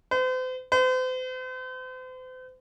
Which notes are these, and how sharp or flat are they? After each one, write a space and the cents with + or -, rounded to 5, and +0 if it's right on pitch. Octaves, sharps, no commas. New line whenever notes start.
C5 -40
C5 -40